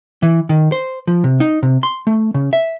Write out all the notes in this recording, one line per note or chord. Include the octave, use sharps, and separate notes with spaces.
E3
D#3
C5
F3
C3
D#4
C3
C6
A3
C#3
E5